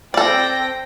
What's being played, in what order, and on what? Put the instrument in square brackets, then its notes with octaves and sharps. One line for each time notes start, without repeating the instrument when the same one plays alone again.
[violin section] C4 G5 A#6 [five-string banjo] A4 D5